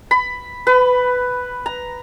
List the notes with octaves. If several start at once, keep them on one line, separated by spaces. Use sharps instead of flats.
B5
B4
A#5